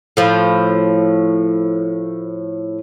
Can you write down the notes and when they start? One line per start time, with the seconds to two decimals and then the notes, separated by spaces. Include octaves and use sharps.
0.17 A2 F3